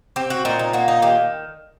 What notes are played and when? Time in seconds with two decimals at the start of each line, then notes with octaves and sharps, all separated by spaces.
0.16 C4 G4
0.30 F#4
0.45 A#2 D#4
0.59 D#4
0.73 A#3 F#4
0.88 D#4
1.02 D#3 G4